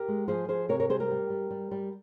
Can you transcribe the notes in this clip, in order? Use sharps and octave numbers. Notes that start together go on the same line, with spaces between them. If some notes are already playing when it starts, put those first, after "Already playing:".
Already playing: G4 A#4
G#3
F3 G#4 C5
F3 G#4 C5
C3 A#4 C#5
A#4 C#5
G3 G#4 C5
G4 A#4
G3
G3
G3
G3